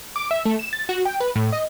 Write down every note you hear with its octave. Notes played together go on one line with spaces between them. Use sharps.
D6
E5
A3
E7
A6
F#4
G5
B4
A2
D#5